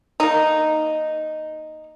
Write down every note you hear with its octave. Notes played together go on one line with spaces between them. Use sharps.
A#3 D#4